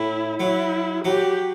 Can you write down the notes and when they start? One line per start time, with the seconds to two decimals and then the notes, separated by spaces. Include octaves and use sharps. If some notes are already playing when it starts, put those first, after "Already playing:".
Already playing: A2 E4
0.39 F#3 E4
1.04 F#3 G4